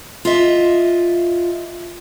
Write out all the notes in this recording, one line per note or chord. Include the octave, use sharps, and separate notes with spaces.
F4 D#5 E5